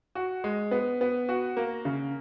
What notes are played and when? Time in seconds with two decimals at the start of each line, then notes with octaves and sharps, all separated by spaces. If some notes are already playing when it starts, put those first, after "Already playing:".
0.15 F#4
0.44 G#3
0.71 B3
1.01 B3
1.29 F#4
1.57 A#3
1.85 C#3